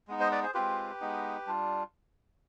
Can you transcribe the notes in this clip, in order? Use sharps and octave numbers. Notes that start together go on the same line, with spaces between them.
G#3 B3 D#4
C5 D#5
B4 D5
G#4 C5
G#3 C4 F4 G4 B4
G#3 B3 D#4
G3 D4 F4